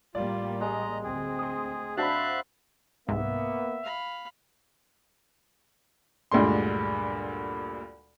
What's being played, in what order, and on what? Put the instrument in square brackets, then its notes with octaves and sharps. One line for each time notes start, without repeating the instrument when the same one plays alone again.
[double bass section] A1 G3 A#3 [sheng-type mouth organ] F4 [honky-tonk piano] D5
[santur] G#3 [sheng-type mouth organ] D#5 A#5
[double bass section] D2 C4 [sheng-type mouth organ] G#4
[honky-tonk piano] C6 D#6
[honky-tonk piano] D4 F#4 C5 [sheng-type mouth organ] E5 F5 F#6 [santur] A5 B5
[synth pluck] C2 G#2 [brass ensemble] A#3 B3 [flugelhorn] E5
[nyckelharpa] F5 B5
[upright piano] D2 G2 A#2 G#3 C6